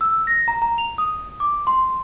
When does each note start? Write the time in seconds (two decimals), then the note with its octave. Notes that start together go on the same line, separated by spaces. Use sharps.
0.01 E6
0.27 A#6
0.48 A#5
0.62 A#5
0.78 F7
0.98 D#6
1.40 D6
1.67 C6